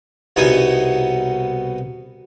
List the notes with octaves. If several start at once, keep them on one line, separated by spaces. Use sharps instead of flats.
C2 B2 B3 D#4 G#5